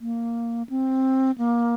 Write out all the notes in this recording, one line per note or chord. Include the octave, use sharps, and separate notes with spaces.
A#3
C4
A#3